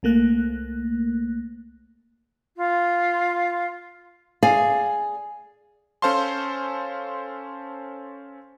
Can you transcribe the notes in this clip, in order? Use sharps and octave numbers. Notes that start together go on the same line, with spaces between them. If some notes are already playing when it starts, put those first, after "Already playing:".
C2 A3 A#3 F#6
F4
G#4 D5 F5 G#5
C#4 A4 C5 F5 A5 C6